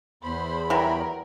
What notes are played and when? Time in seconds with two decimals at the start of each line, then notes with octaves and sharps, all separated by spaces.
0.23 E2 C5 B5
0.70 E3 F#3 G3 A#4